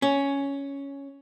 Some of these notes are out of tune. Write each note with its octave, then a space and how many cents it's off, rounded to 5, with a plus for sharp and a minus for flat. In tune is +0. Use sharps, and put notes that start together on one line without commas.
C#4 +5